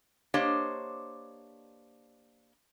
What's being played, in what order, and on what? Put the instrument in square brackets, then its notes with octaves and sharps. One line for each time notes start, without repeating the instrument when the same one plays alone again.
[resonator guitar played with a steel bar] A#3 D4 G4 C5 C#5 D#5